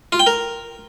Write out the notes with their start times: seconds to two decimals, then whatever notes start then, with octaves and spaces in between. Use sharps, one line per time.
0.12 F4
0.20 G5
0.27 A#4